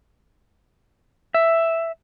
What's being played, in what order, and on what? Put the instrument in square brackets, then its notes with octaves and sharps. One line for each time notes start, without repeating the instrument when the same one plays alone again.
[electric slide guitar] E5